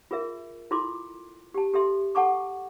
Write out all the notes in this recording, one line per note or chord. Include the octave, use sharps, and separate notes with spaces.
F4 G#4 A#4 E5
E4 F4 A4 C6 D6
G4 A5
G4 A4 E5 C6
A4 F#5 A5 C#6 D6